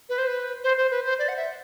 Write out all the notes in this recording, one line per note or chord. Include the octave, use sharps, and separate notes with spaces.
B4
C5
B4
C5
C5
B4
C5
D5
F#5
E5